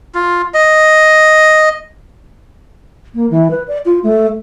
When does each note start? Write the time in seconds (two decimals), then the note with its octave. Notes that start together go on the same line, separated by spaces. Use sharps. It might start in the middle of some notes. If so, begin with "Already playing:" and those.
0.15 F4
0.54 D#5
3.14 A#3
3.30 E3
3.50 B4
3.67 D5
3.85 F4
4.03 A3